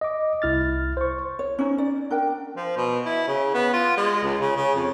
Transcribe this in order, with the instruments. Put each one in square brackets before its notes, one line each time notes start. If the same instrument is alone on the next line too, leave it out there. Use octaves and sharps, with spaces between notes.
[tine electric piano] D#5 D6
C2 E4 F6 A6
C5 C#6
[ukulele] C#5
C#4 D#4
D5
D4 A#4 G5
[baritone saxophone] F3
B2
E4
C#3
B3
F4
G#3
C#2
C#3
C#3
F2